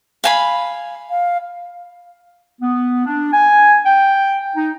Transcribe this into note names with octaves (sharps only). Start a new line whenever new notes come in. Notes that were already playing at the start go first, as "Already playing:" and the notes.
F5 G#5 B5
F5
B3
D4
G#5
G5
D#4